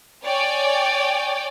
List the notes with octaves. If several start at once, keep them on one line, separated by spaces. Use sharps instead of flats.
C#5 D5 G5 G#5